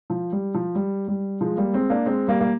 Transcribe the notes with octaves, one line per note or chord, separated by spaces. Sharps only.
F3
G3
F3
G3
G3
F3 G#3
G3 A#3
G#3 C4
A#3 D4
G#3 C4
G3 A#3
A#3